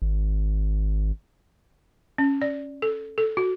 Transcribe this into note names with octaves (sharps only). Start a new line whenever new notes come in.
G#1
C#4
D5
A4
A4
F#4